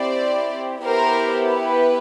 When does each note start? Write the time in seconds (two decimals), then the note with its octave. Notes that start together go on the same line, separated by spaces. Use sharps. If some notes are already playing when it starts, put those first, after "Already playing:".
Already playing: C4 E4 G4 C5 D5
0.84 B3 E4 G4 A#4 C5
1.53 B4